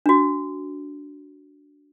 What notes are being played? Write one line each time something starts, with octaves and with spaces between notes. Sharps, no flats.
D4 F#4